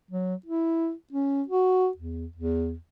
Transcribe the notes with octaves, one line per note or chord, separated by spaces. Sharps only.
F#3
E4
C#4
F#4
E2
E2